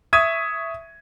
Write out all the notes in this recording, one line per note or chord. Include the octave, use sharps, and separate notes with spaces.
E5 C#6 D#6 G#6 B6 D#7